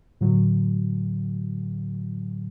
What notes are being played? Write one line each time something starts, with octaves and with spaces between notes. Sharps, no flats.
A2 D3 F#3